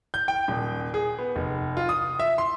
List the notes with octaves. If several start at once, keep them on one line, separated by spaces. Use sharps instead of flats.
G6
G5
D#1
G#4
B3
F1
F4
D#6
E5
C6